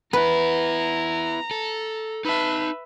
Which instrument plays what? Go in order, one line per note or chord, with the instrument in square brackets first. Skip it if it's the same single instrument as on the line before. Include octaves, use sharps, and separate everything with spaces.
[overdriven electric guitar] B3 E4 [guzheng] B4 [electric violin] A#5
[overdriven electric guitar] A4
[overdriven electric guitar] D#4 A5 [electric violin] B4 E5